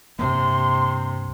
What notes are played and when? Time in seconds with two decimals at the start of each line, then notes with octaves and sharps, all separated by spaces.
0.19 C2 G2 C3 A#3 C6